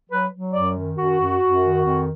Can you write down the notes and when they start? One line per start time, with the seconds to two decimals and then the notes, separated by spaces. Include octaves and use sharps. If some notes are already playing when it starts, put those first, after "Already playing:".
0.09 F#3 B4
0.31 F#3
0.53 F#2 D5
0.75 D#3
0.97 F#2 F#4
1.20 F#2
1.41 F#2
1.64 D#3
1.84 F2